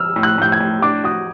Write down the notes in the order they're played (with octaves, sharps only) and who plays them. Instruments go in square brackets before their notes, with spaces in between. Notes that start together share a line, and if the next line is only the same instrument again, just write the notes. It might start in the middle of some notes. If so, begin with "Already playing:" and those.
Already playing: [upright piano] E6 F6
[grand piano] A2
[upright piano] F#6
[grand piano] A2 [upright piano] G6
[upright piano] G#6
[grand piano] A2
[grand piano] D4 [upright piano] D6
[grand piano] F#4 [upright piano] D#6